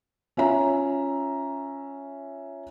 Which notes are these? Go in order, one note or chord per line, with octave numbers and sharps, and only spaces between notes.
C#4 F4 E5 A#5